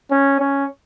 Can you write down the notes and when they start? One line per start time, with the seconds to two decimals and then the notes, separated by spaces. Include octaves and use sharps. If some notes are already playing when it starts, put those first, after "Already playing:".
0.11 C#4
0.40 C#4